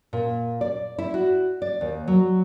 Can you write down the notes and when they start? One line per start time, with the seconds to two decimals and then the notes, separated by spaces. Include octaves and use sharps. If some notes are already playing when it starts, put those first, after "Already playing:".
0.13 A#2
0.61 D5
0.98 E4
1.14 F#4
1.62 D5
1.81 D#2
2.08 F#3